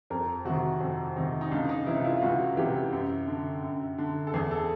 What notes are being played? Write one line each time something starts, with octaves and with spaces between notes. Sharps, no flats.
F2 A#4
C3 D#3 F#4
F2
C3 D#3 D#4
D#4
C#2 D4
D#4
C3 E3 E4
F4
E4
F4
C#2 F#4
C3 E3 G4
F#2
D3
F#2
D3
A4
E2 G#4
A4